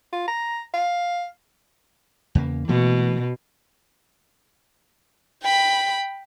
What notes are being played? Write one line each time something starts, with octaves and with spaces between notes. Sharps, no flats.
F4
A#5
F5
E2 C#3 A#3
B2 E3 A3 A#3
G5 B5